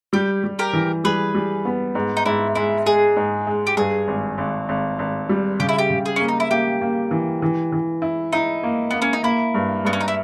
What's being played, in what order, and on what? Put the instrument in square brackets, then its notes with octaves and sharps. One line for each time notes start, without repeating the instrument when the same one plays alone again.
[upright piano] G3 [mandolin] G4
[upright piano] G3
[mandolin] G4 A#4
[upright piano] E3
[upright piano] G3 [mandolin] G#4 B4
[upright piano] G3
B3
G#2
[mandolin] D#4
[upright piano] G#2 [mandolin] E4
[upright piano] G#3 [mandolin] E4
[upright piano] G#3 [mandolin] G#4
[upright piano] G#2
G#3
[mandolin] G4
[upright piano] G2 [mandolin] G#4
[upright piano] G#1
G#1
G#1
G#1
G3
[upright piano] C#3 [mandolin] G4
[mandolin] E4
G4
[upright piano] C#3
[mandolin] G#4
[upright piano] A#3 [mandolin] C#4
[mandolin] D#4
E4
[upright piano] A#3 [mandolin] G4
[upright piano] A#3
E3
E3
E3
E4
[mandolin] D#4 [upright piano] E4
[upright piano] A#3
[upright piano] A#3 [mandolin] B3
[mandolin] C#4
D#4
[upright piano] A#3 [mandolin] E4
[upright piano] G2
[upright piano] G2 [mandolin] B3
[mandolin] C#4
D#4
E4